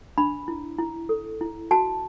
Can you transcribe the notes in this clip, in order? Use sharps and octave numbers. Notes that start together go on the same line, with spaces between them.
D4 B5
E4
E4
A4
E4
F#4 A5